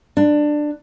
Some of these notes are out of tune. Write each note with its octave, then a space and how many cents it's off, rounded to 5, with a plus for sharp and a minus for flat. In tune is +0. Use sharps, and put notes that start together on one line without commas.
D4 +15